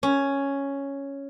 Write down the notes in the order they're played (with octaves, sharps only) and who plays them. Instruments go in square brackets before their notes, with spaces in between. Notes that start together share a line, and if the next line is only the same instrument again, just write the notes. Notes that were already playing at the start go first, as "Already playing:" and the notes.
[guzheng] C#4